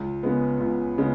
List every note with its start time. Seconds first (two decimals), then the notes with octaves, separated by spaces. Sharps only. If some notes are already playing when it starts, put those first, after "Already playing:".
Already playing: C#2
0.23 C#3 G#3 B3
0.60 C#2
0.98 C#3 G#3 B3